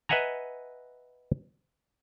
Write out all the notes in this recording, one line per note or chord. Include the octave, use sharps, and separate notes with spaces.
B4 D#5 E5 F#5 G#5 A#5